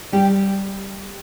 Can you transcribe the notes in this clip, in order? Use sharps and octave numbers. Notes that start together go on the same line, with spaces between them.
G3 G4